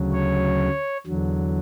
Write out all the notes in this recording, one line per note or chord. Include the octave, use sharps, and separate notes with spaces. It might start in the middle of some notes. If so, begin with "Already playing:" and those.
Already playing: D2 C#3 F#3
C#5
E2 D3 F#3